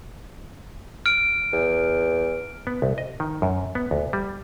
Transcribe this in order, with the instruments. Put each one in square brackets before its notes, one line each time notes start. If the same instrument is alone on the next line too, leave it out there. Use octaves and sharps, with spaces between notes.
[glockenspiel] F6 D7
[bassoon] E2
[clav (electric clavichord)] B3
C2
D#5
D#3
F#2
B3
D2
G3